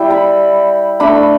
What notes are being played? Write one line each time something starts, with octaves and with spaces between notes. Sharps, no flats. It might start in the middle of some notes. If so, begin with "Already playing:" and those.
Already playing: G3 E4 G5
B5
A3 D4 B5